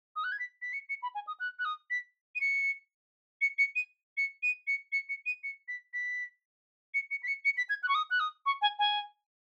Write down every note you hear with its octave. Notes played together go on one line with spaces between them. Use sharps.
D#6
F#6
G#6
B6
B6
C#7
C#7
B5
G#5
D#6
F#6
F#6
D#6
B6
D#7
C#7
C#7
C#7
D#7
C#7
D#7
C#7
C#7
C#7
D#7
C#7
B6
B6
C#7
C#7
B6
C#7
C#7
B6
G#6
F#6
C#6
D#6
F#6
D#6
C#6
G#5
G#5